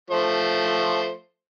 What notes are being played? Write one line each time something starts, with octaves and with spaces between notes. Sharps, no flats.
F3 A3 C5